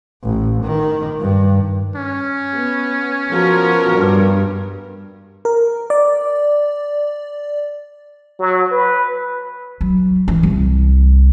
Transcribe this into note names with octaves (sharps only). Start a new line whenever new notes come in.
A1
D#3
G2
C#4
B3
F3 B3 F#4 A#4
G2
A#4
D5
F#3
B4
F#3
E3
C2